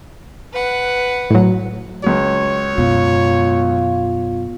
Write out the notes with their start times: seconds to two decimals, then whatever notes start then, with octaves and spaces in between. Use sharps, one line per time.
0.53 B4 F#5
1.30 A2 F#3
2.04 C#2 F#3 C#5
2.78 F#2 B2 F4